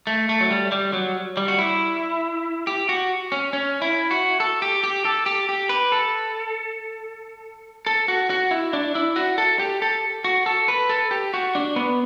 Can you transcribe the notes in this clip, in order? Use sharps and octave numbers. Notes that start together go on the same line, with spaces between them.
A3
A3
F#3
G3
G3
F#3
G3
F#4
E4
G4
F#4
C#4
C#4
E4
F#4
A4
G4
G4
A4
G4
G4
B4
A4
A4
F#4
F#4
E4
D4
E4
F#4
A4
G4
A4
F#4
A4
B4
A4
G4
F#4
D4
B3